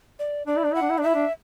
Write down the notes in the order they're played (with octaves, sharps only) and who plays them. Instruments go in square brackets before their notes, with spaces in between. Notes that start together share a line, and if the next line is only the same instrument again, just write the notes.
[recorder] D5
[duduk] D4 [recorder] D5
[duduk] E4
D4
[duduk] E4 [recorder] F#5
[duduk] D4
E4
[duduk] D4 [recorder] D5
[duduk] E4 [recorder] E5
[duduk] D4